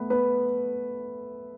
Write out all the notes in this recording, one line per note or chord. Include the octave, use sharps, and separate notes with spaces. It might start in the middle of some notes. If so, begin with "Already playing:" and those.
Already playing: A3 B3 B4
B3 B4